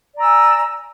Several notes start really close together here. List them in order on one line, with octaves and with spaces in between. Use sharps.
D5 A#5 E6 G#5